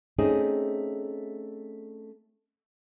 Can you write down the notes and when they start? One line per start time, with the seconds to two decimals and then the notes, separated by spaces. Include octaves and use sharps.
0.18 A3 C4 C#4 D#4 G#4